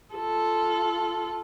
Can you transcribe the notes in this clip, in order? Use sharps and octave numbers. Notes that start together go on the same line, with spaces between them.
F4 A4